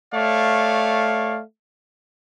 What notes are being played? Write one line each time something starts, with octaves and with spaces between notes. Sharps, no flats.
A3 C#5 D5 F5